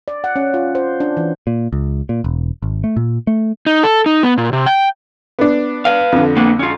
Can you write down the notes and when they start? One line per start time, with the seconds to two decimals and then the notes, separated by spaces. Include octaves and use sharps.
0.08 D5
0.24 F#5
0.36 C#4
0.54 F4
0.75 C5
1.00 D4
1.17 E3
1.47 A#2
1.73 C#2
2.09 A#2
2.24 E1
2.62 G#1
2.84 A3
2.97 A#2
3.27 A3
3.66 D#4
3.83 A4
4.06 D#4
4.23 B3
4.38 A#2
4.53 C3
4.66 G5
5.39 B3 D4
5.85 B4 F5
6.12 F2 D3
6.37 A#3 B3 D4
6.59 C#4 F4